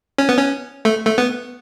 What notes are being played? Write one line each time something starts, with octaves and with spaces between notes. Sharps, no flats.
C#4
B3
C#4
A3
A3
B3